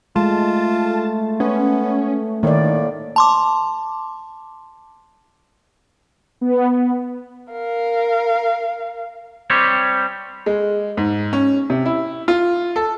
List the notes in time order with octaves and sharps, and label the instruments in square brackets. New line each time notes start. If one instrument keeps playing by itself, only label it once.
[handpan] G#3 [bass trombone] A3 [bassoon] F4 [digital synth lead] A5
[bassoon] B3 [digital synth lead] C#4
[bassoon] A2 [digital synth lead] D#3 [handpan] A#3 D5
[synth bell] A5 C6 D6
[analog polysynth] B3
[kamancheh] A#4 F5
[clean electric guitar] G3 C4 G4 C#5
[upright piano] G#3
G#2
C#4
C3
E4
F4
A4